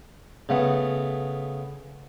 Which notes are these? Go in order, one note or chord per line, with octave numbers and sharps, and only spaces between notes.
C#3 A3 B3